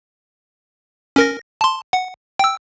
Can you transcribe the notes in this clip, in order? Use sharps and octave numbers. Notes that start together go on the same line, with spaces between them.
C#4 A#4 A#6
A5 C6
F#5
G5 E6